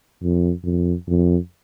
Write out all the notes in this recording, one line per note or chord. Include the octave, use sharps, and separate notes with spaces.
F2
F2
F2